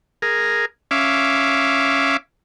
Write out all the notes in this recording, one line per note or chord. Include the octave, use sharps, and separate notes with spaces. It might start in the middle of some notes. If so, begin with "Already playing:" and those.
G#4 A#4
C#4 E5 F5 D6